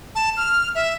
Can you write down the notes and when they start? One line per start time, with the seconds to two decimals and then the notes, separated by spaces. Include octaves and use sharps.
0.15 A5
0.37 F6
0.75 E5